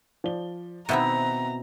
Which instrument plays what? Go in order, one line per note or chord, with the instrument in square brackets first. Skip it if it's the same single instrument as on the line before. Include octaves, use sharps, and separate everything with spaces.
[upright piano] F3 D5 G7
[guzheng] B2 C4 E4 [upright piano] D#3 E5 F#5 [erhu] A#5